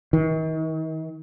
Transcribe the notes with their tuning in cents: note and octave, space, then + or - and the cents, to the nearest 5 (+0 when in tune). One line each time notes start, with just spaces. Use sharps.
D#3 +40